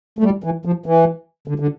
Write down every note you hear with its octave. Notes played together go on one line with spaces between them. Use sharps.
A3
G3
E3
F3
E3
D3
D3